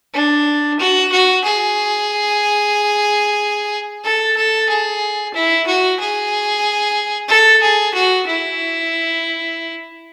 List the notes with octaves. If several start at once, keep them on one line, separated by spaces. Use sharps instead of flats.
D4
F#4
F#4
G#4
A4
A4
G#4
E4
F#4
G#4
A4
G#4
F#4
E4